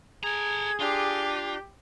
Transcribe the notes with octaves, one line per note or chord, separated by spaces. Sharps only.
G#4 A4 A#5 G#6
D4 F4 G4